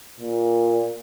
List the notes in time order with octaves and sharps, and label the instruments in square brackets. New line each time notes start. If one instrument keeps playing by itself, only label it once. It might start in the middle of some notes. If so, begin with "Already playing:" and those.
[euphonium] A#2